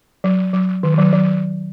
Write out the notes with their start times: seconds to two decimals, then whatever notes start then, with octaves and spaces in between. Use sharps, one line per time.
0.24 F#3
0.53 F#3
0.83 D#3
0.94 D#3
0.98 F#3
1.13 F#3